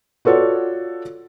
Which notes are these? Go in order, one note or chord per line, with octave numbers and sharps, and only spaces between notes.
F4 F#4 A4 C#5 D5 F#5